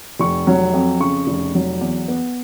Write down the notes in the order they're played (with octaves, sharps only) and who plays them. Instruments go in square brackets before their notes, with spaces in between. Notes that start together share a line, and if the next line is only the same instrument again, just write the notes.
[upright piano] F1 C#6
F#3
F2
C#3 C#6
F1
F#3
E2
B3